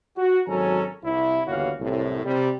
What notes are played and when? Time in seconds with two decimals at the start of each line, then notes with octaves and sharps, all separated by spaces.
0.16 F#4
0.47 G#1 F#3 C#4 A4 G#5 A#5
1.03 C2 E4
1.46 G1 D#2 E3 F#4 C#5 F5
1.80 C2 F#2 A2
2.25 C3 G3